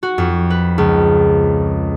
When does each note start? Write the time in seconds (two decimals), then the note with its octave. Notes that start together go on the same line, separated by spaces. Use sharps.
0.03 F#4
0.18 F2
0.50 B4
0.78 C#2